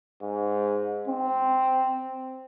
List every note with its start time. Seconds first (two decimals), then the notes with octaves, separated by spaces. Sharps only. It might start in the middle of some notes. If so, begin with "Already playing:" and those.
0.22 G#2
1.08 C4